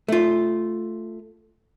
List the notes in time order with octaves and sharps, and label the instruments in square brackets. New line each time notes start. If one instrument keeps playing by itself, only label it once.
[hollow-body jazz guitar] A3 F4